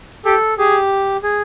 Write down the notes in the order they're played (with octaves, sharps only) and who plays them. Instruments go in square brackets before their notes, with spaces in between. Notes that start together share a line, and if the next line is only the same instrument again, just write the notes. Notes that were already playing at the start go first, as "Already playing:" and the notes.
[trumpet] G4 [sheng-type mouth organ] A4
[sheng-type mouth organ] G4 [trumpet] G#4
[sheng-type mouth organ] G#4